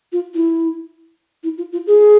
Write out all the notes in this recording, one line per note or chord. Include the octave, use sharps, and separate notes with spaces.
F4
E4
E4
F4
F4
G#4